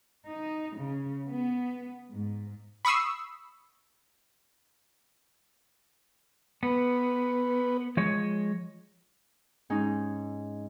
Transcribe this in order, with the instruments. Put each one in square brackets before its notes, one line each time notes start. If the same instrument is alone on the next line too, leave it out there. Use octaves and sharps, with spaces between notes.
[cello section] D#4
C#3
B3
G#2
[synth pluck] B5 C#6 D#6 E6 C7
[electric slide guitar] B3 [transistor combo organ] B4
[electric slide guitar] F3 G#3 C#5
[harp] G#2 C#4 D#4